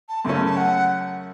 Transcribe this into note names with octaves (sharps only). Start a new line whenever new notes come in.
A5
F#2 C#3 A3 C#4 A5
A5
F#5